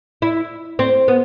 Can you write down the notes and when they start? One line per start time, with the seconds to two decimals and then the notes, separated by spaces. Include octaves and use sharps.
0.22 E4
0.79 C4
1.08 B3